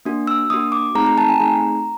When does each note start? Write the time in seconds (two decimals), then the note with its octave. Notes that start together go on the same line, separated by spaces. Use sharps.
0.05 A#3 D4 F#4
0.27 E6
0.50 A#3 D4 F#4 D#6
0.72 D6
0.95 A3 C4 D#4 G#4 A#5
1.06 A#5
1.18 A5
1.29 G#5
1.40 A3 C4 D#4 G#4 A#5